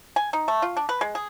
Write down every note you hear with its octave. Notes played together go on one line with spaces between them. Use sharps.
G#5
D#4
A3
F4
D4
B4
G#3
G#4